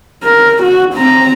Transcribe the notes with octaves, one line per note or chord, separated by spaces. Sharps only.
A#4
F#4
C4 A#5